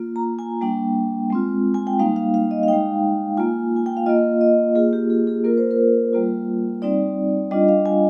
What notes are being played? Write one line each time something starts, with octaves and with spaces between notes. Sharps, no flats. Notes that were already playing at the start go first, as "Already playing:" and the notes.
Already playing: A#3 F4
A#5
G#5
G3 A#3 D4 G5
G#3 C4 F4
G#5
G5
G3 A#3 D#4 F5
F5
F5
D#5
F5
G#3 D#4 G5
A#3 F4 G#5
G#5
G5
F5
A#3 F4 D#5
D#5
A#3 F4 G#4
G4
G#4
G#4
A#3 F4 A#4
C5
A#4
G3 A#3 F4
G3 C4 D#4 D5
G3 D4 F4 D#5
F5
G#5